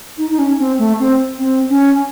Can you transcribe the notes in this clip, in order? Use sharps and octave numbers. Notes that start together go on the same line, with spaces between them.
D#4
D#4
C#4
C4
A3
C4
C4
C#4